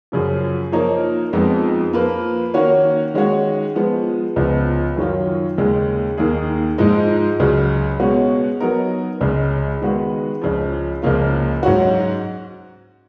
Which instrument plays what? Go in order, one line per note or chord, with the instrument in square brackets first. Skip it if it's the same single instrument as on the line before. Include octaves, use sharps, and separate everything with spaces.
[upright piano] F#2 C#3 F3
F3 A#3 D#4 A#4 C#5
F2 F3 G#3 B3 D#4
F3 A#3 F4 B4
D#3 A#3 C#4 F#4 C#5
D#3 G#3 C#4 F#4 C#5
F3 G#3 B3
C#2 C#3 F3 B3
F#2 D#3 F#3 C#4 F4
D#2 C#3 G#3
D#2 D#3 A#3 D#4 G#4
G#2 F3 G#3 D#4
C#2 C#3 F#3
B2 G#3 C#4 F#4
F#3 B3 D#4 A#4
C#2 C#3 G#3
D#3 G#3 B3 F#4 B4
C#2 C#3 F3
C#2 C#3 F3 A#3 F4
G#2 F#3 C#4 F#4